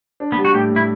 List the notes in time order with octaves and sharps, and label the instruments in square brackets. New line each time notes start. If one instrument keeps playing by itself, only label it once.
[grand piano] D4
[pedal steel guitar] B3
[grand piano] G3
[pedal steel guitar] F#4
[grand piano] A2 [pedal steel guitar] G4
[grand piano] A2
[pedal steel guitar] E4